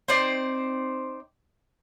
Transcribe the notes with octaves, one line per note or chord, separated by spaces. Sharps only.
C4 D#4 C5 D5